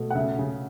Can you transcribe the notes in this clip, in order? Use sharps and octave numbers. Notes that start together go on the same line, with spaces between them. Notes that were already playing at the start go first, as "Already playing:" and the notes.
Already playing: B2 A3
F#5
C#3 E5
C#3